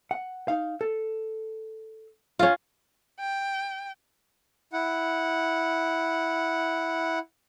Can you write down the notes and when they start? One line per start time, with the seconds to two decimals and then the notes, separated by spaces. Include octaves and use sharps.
0.11 F#5
0.48 D#4 F5
0.81 A4
2.39 C#4 F4
3.20 G5
4.73 E4 F#5